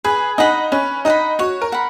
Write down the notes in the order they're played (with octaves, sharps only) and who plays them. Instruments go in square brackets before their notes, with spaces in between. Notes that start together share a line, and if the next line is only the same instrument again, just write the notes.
[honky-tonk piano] G#4 [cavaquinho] B4
[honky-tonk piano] D#4 [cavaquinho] D#5 F#5 B5
[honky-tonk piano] C#4 [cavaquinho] B4
[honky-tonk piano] D#4 [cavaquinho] D#5 F#5 B5
[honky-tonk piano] F#4 [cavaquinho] C#5
[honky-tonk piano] A#4
[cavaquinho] F#5 B5